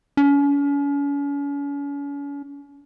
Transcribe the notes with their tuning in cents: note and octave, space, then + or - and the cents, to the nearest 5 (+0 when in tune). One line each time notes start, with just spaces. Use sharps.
C#4 +40